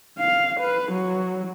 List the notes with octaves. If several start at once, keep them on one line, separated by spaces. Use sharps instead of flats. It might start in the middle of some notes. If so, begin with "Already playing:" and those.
F5
B4
F#3